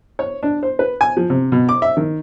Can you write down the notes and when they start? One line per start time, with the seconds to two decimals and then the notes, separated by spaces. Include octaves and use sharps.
0.19 C#5
0.43 D4
0.63 C5
0.79 B4
1.01 G#5
1.17 F3
1.30 C3
1.52 B2
1.69 D6
1.82 E5
1.97 D#3